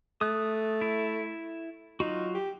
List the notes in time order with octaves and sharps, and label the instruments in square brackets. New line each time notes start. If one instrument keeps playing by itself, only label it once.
[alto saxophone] A3 [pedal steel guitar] D#6 F#6
[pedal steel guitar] E4
[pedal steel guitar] F#3 F4 F#4 [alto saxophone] D#4
[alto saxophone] G4